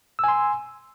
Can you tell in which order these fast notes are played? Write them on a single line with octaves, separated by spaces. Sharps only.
E6 G#5 C6